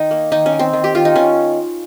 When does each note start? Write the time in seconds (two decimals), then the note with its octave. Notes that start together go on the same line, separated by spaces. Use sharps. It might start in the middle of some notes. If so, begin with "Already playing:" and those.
Already playing: D#3 D#4
0.11 A#3
0.32 D#3 D#4
0.46 C#4
0.53 D#3
0.59 C4
0.73 D#3
0.84 G4
0.95 D#3 F4
1.05 D#4
1.16 D#3 C#4